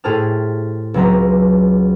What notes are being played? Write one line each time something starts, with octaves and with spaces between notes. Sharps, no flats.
A2 G4 G#4 C5 A5 F6
C#2 F#3 C4 B4 A#5